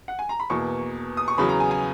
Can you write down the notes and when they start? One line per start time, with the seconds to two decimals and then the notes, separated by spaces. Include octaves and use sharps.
0.08 F#5
0.19 G#5
0.29 A#5
0.40 B5
0.50 E2 B2 A#3 C#6
1.17 D#6
1.28 C#6
1.38 E2 C#3 F#3 B5
1.49 A#5
1.60 G#5
1.71 G#5